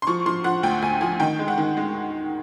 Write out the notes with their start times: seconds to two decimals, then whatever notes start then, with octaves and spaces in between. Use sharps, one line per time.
0.02 C6
0.07 F3 C#6
0.26 F3 C6
0.44 F3 F#5
0.63 D2 G5
0.82 D2 G#5
1.01 F3 G#5
1.20 D#3 G5
1.39 G#3
1.48 F#5
1.58 D#3
1.77 G#3